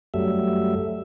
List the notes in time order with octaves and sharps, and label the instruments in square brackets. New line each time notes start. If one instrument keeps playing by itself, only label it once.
[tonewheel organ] F#2 F#3 G3 A3 E5